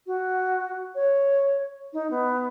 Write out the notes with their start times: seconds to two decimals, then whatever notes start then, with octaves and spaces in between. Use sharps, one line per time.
0.07 F#4
0.95 C#5
1.93 D#4
2.11 B3